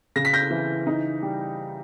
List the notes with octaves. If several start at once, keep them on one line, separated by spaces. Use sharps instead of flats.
C#3 A#6
B6
G6 A#6
E3
D#4
G3